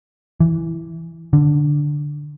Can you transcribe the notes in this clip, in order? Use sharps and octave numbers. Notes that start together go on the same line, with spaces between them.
E3
D3